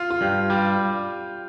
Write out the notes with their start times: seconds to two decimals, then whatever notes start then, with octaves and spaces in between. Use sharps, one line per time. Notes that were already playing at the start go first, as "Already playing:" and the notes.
Already playing: F4
0.11 F4
0.21 G2 G4
0.50 G3 G4